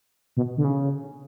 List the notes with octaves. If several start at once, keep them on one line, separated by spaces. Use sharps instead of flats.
B2
D3
C#3